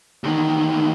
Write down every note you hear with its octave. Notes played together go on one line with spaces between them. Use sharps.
E2 D#3